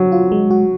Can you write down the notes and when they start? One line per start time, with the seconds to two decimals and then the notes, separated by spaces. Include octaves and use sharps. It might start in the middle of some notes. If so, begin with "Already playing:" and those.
Already playing: F#3
0.12 F4
0.32 G#3
0.51 F#4